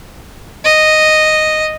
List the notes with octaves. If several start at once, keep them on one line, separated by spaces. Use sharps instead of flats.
D#5